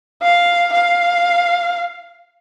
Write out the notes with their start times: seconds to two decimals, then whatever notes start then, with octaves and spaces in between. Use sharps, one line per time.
0.22 F5
0.73 F5